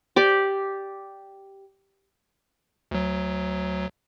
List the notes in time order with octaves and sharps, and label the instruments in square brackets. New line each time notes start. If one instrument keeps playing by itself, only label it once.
[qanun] G4 D5
[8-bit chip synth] D2 F#3